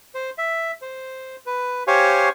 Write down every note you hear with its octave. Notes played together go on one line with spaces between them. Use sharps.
C5
E5
C5
B4
G4 C5 C#5 F5 G#5 C#6